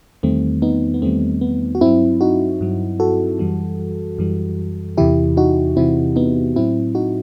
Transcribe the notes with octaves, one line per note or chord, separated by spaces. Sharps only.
E2 D#3 G3 A3 C4
B3 D#4
B3
E2 D#3 G3 A3 C4
B3
F#4
G2 F#3 C4 E4
D#4 F#4
G2 F#3
F#4 A4
F#2 E3 G3
F#2 E3 G3
E2 C3 E3 E4 G4
D#4 F#4
E2 C3 E3 C4 E4
B3 D#4
A2 F#3 C4 E4
D#4 F#4